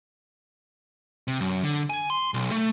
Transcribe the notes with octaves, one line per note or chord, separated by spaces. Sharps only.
C3
F#2
D3
G#5
C6
B1
A3